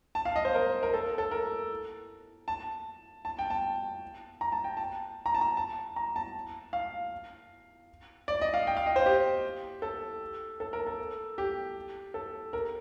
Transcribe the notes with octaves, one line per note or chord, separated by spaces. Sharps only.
A5
F5
D#5
C5
A#4
A#4
A4
A4
A#4
A5
A5
G5
A5
A#5
A5
G5
A5
A#5
A5
A#5
A5
A#5
A5
F5
D5
D#5
F5
G5
F5
D#5
C5
G4
A4
A4
A#4
A4
G4
A4
A#4